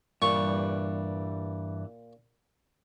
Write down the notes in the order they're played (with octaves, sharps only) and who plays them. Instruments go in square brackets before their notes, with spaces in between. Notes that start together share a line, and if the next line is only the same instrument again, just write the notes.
[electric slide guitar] G2 E3 G3 [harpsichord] A#2 C#6